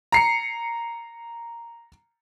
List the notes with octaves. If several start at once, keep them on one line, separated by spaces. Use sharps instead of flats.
A#5 C7 C#7